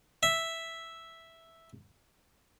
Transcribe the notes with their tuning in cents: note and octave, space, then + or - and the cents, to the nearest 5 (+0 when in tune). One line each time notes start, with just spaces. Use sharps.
E5 -5